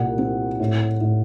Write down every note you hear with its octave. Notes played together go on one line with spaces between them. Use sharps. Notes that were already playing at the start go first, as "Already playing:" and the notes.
Already playing: C2 A#2 F#5
C4
A2
A2